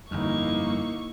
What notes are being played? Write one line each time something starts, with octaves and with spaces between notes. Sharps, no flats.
G1 F2 A#3 D#4 E4 C#6